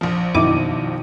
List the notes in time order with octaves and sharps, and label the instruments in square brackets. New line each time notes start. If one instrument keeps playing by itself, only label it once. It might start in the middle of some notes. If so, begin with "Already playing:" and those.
[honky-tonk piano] A#1 F3
[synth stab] F#2 E4 D6 [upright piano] B2 D#3 D#7